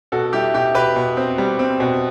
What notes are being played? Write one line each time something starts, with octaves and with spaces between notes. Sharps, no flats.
B2 F#4 A4
G3 E4 G4
B2 E4 G4
B2 G4 B4
B2
C4
G3
C4
B2